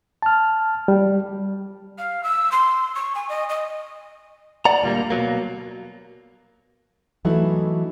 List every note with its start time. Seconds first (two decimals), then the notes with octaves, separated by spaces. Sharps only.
0.22 A5 F6
0.88 G3
1.98 F5
2.24 E6
2.52 C6
2.95 C#6
3.15 G#5
3.29 D#5
3.49 D#5
4.65 D5 F#5 A#5
4.82 D2 A#2 G3 A#3
5.10 B2 F#3 A#3
7.25 E3 F#3 A3 D#4 E4 F#4